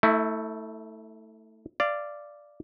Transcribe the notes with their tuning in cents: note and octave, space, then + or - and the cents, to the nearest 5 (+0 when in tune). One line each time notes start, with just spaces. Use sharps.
A3 +10 E4 -30
D5 +0 F5 -25